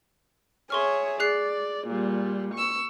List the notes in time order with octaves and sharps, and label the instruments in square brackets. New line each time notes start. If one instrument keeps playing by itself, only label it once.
[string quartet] G#4 C#5 E5 [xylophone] C6 C#6 F6
[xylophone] G#4 F#6 C7 [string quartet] D5
[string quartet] A#2 G3
C#6 E6